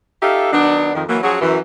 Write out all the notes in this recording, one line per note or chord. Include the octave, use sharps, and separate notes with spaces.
D#4 F4 G4 A4 E5 F5
D#3 F#3 B3 D4
F2 D#3
E3 F#3 A#3
F3 F#3 C#4 F#4 G#4
F#2 E3